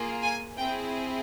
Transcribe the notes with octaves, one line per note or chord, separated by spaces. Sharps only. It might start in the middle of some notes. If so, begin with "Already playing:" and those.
Already playing: A#3 F4 G#4
G#5
C4 E4 G#4 G5